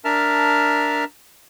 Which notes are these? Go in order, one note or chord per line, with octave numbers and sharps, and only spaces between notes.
D4 A#4 E5 A5 F6